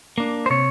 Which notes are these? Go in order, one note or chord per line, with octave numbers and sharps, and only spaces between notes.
A#3 D4
C5
C3 C#5